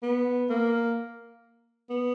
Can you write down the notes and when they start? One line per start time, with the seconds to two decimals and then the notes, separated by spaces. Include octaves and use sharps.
0.03 B3
0.50 A#3
1.90 B3